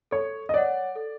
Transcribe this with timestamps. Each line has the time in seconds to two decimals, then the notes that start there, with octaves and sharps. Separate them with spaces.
0.11 A4 C#5
0.49 D#5
0.54 C#5 D5 F#5
0.96 A4